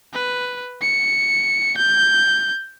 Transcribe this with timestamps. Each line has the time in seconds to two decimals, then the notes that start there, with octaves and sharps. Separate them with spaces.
0.13 B4
0.81 C#7
1.77 G6